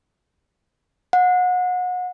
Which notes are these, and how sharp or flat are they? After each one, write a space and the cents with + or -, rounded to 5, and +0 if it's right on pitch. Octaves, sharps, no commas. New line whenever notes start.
F#5 -30